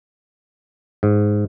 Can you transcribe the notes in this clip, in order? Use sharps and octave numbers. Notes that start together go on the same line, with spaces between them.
G#2